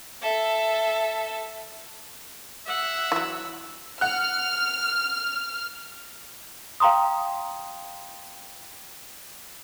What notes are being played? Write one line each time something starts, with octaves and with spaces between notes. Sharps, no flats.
A4 E5
E5 F#5 E6
E3 F#3
F#5 F6 F#6
F5 G5 A#5 C6 D#6